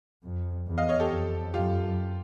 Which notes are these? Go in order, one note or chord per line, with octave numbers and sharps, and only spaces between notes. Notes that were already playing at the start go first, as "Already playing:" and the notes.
F2
E2
D#5 F5
C#5 D#5
G4 A4
F2
F#2 F4 G4